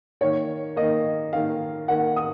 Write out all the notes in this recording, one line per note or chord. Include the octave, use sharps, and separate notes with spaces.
D#3 A#3 C#5
D#3 A#3 D#5
D#3 A#3 F5
D#3 A#3 F#5
D#6